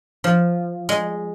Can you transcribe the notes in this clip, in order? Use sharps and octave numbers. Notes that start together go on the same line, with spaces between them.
F3
G#3